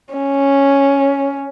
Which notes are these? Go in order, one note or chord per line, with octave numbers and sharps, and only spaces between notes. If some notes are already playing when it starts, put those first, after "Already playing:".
C#4